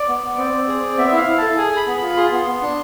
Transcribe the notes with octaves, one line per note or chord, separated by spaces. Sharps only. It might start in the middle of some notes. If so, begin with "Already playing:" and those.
Already playing: D5
B3
B3
C4
C4
G#4
C4
B3 E5
E4 F5
E4
A4 A5
G#4 G#5
G#4 B5
B3
F4 B5
G#4 C6
B3
B3
D4